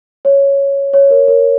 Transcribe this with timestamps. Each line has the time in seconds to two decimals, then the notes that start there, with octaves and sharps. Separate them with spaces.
0.25 C#5
0.94 C#5
1.11 A#4
1.28 A#4